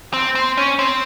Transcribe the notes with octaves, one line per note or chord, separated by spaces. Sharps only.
C4
C4
C#4
C4